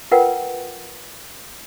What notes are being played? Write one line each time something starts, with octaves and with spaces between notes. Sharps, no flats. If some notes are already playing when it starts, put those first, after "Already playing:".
F4 A#4 B4 F#5 G5